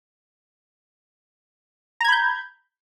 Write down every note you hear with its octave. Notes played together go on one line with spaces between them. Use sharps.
A#5 B5 G6 G#6